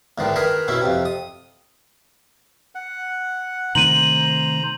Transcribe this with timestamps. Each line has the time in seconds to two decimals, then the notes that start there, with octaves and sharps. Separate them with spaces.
0.18 E2 G#2 D3 D#3
0.36 D#3 G#4 A#4 B4
0.68 B2 C#4 E4
0.81 F2 C3
1.05 D#6
2.75 F#5
3.75 C3 D#3 A3 C5 A#5 D#7 F#7